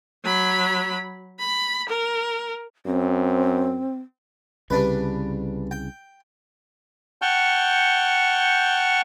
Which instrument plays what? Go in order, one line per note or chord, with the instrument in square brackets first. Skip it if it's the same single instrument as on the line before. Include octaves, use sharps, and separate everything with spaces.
[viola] F#3 B5
B5
A#4
[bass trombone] F#2 [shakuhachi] C4
[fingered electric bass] C2 C#3 [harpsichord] G3 D4 B4
[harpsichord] G5
[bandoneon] F#5 G5 A5 C#6 F6 G6